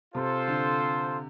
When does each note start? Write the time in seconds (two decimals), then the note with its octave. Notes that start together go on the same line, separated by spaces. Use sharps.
0.14 C3 F4 A4 C5
0.48 D3